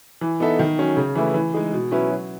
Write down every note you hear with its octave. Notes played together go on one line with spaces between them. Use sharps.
E3
B3 D#4 A4 E5
D#3
F#3 C#4
C#3
E3 A3 E4 B4
E3
G#3 D#4 G#4
B2
F#3 C#4 E4 B4
F#3